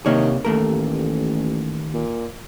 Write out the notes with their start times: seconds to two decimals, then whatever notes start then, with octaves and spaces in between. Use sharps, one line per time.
0.06 C3 D#3 A#3 C#5
0.45 A1 D#2 A3 A#4
1.94 A#2